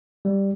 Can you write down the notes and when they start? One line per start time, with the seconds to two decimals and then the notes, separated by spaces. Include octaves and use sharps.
0.25 G3